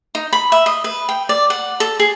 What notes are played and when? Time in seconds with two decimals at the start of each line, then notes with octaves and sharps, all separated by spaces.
0.15 D#4
0.33 B5
0.52 E5
0.66 D#5
0.84 B4
1.09 G5
1.29 D5
1.50 F#5
1.80 A4
1.99 G#4